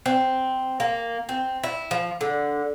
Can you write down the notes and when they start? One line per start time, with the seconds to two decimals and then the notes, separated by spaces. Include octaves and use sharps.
0.06 C4
0.80 A#3
1.29 C4
1.63 E4
1.91 F3
2.21 D3